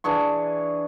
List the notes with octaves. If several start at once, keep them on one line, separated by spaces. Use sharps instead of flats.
E3 D4 G#4 C#6